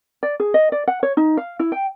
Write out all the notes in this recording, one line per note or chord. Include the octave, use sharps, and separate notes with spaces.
D5
G#4
D#5
D5
F#5
C#5
D#4
F5
E4
G5